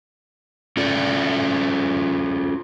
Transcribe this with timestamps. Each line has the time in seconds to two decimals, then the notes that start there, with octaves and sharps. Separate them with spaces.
0.77 C#4 F4 A4 D5